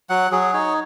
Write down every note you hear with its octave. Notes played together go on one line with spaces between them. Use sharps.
F#3 F#5
F#3 G#4
D#4 C#5